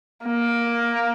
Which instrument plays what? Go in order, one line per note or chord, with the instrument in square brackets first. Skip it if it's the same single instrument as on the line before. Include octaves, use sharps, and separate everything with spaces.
[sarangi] A#3